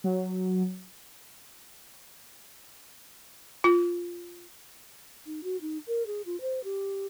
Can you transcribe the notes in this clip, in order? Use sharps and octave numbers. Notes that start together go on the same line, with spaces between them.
F#3
F4
D#4
F#4
D#4
A#4
G#4
F4
C5
G4